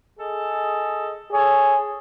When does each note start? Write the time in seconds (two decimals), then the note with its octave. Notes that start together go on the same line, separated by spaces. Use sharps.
0.19 G#4 A4 D#5
1.31 G#4 A4 C#5